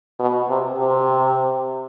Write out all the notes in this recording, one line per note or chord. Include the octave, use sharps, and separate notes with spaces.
B2
C3
C3